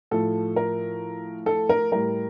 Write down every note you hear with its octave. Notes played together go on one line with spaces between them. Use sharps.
A2 F3 A4
A#4
A4
A#4
A2 G3 A#4